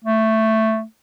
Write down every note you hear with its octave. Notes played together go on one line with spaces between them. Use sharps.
A3